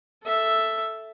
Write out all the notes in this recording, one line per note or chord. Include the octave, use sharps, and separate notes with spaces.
A4 E5